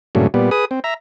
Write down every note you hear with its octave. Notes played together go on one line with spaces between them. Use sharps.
G2 A#2 C#3 F#3 A3
A#2 G3 B3
G#4 B4 D#6
C4
E5 A#5